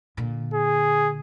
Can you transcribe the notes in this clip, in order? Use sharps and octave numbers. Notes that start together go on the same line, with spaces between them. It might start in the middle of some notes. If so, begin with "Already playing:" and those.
A#2 D3
G#4